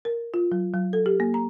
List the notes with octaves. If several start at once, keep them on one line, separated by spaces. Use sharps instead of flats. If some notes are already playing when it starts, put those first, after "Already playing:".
A#4
F4
F#3
F#3
A4
G4
A#3
A#5